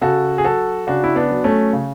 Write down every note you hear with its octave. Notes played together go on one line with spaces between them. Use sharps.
C#3 F#4 A4
G#4
F#3 F#4 A4
C#3 D4 F#4
E4
B3 D4
F#3
A3 C#4
C#3